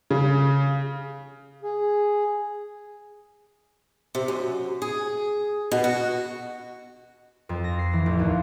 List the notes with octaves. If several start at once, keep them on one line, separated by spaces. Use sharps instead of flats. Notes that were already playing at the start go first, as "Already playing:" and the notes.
C#3
G#4
C3
F#2
G#4
B2
F#4
F2
A#6
C7
E3
A1
D#2